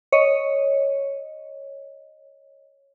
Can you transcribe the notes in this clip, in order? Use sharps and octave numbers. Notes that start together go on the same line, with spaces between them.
C#5 D#5